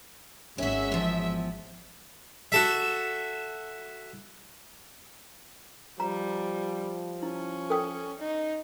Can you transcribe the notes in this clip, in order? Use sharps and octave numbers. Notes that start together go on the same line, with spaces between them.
G#1 G#3 C#4 F#4 E5
E2 F3
F#4 A4 E5
F3 G3 A#5
C#4 E4
A4 G5 D#6
D#4